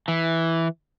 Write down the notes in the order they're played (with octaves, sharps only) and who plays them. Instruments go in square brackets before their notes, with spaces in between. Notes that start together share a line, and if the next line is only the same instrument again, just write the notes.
[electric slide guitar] E3